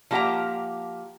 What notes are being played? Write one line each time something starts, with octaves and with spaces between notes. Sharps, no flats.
F3 A#3 G4 E5 F#5 A#5